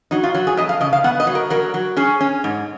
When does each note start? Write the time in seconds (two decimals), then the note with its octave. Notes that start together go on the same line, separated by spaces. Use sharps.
0.11 F#3 D#4
0.23 F4
0.35 F#3
0.47 G#4
0.57 F2 D#5
0.69 F5
0.81 C#3 D#5
0.93 F5
1.04 B3 F#5
1.20 D#5
1.27 F#3
1.35 A#4
1.50 F#3 A#4
1.74 F#3
1.97 C#4 G#4
2.21 C#4
2.44 G#2